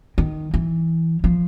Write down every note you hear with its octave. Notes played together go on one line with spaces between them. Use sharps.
D#3
E3
F3